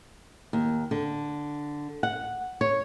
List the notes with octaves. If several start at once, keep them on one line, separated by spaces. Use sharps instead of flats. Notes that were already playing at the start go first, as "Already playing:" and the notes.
D#2
D3
F#5
C#5